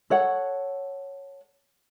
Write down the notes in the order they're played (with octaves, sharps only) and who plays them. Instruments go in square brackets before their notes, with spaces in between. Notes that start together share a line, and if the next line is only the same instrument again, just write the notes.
[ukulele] A4 C#5 F#5